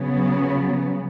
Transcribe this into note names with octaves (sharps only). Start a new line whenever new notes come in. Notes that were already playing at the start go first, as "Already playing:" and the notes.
Already playing: C#3 F#3 B3